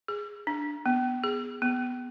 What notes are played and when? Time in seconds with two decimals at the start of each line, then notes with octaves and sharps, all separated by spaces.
0.08 G#4
0.47 D4
0.86 B3
1.24 G#4
1.62 B3